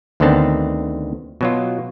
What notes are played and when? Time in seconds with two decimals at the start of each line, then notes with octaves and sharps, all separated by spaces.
0.20 D2 D3 D#3 B3 C4 A5
1.41 B2 F#3 F4